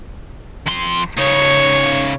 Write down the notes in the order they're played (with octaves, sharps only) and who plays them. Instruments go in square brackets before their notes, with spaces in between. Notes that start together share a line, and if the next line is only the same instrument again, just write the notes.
[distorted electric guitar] F2 C6
[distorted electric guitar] C#3 D#4 [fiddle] C#5